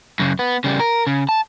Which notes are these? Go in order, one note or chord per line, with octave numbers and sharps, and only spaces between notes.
F#2 C#3
B3
C#3 G3
A#4
C#3
A5